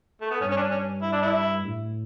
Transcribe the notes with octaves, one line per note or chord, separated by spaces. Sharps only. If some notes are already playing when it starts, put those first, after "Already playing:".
A3
B3
G2 C#4
C#4
D4
C#4
E4
D4
E4
A2